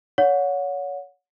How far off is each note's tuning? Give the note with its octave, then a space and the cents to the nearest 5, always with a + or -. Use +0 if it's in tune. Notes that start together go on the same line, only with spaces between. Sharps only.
C#5 +25 F#5 -30